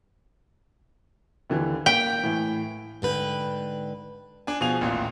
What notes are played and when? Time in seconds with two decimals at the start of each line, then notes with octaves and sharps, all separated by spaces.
1.50 D#2 D3 E3
1.86 A#3 G5 B6
2.23 A2 E3
3.02 G#2 D3 B4 G5
4.47 D4 G#5
4.61 B2 F3 G#4 G#5 F7
4.81 A1 D#2 A#2